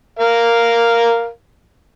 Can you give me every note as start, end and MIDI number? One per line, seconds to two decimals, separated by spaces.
0.19 1.28 70
0.19 1.28 77